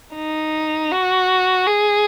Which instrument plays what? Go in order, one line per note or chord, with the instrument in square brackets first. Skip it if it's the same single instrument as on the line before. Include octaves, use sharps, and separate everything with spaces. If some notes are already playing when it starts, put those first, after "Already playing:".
[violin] D#4
F#4
G#4